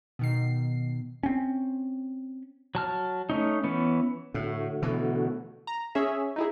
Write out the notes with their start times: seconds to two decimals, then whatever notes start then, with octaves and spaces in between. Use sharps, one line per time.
0.19 B2 D#3 C7
1.23 C4 C#4
2.75 F#3 A5 F6
3.30 A3 C#4 D#4
3.64 E3 B3 C#4
4.34 A2 D3 A3 F#4
4.82 B2 E3
5.67 A#5
5.95 C#4 G#4 E5
6.36 D#4 E4 G#4